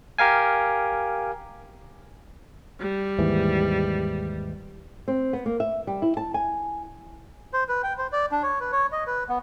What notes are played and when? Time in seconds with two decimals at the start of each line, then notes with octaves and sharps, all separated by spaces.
0.18 G4 A#4 F5 G#5
2.80 G3
3.18 D#2 G#2 E3
5.08 C4
5.33 B3
5.46 A#3
5.60 E5
5.87 G3
6.02 E4
6.17 A5
6.34 G#5
7.53 C5
7.69 B4
7.84 G5
7.98 C5
8.13 D5
8.32 D4
8.43 C#5
8.60 B4
8.72 C#5
8.92 D#5
9.07 B4
9.29 B3